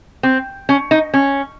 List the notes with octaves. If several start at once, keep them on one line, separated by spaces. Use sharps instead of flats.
C4
C#4
D#4
C#4